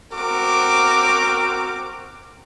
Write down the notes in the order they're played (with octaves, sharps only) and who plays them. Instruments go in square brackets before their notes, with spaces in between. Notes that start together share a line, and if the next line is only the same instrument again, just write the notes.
[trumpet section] C4 F#4 A#4 [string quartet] D6